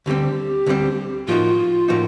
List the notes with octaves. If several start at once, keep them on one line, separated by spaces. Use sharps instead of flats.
D2 D3 G3 C4 G4
D2 D3 G3 C4
A2 F3 A#3 D#4 F4 F#4
A2 F3 A#3 D#4 F#4